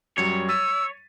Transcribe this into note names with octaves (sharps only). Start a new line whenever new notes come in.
F#2 F#3 G3 C#5
E6 A6 B6 D#7